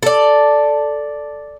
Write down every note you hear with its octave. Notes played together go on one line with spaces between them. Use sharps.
A4 D5